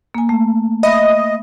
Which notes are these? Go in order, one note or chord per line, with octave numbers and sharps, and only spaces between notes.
A#3 G#5
A3
D#5 E5 B5